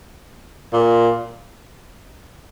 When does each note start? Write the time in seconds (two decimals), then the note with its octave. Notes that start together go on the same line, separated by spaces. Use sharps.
0.73 A#2